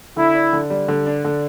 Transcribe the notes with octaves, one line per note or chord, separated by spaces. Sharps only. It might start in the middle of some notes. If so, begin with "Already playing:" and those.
D3 E4
D4
D3
G3
D3
D4
D3